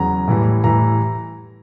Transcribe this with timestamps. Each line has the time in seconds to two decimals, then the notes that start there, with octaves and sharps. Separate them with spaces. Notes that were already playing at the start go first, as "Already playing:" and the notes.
Already playing: E2 C#3 F#3 A#5
0.28 A2 E3 G3
0.64 A2 E3 G3 A#5